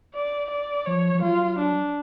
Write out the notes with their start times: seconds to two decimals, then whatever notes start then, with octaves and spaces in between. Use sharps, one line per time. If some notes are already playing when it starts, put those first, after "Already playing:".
0.15 D5
0.50 D5
0.86 F3 C#5
1.14 F3
1.22 F#3 F4
1.59 D4